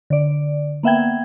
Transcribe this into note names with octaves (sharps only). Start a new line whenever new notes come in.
D3 D5
A#3 B3 E5 F#5 G5 G#6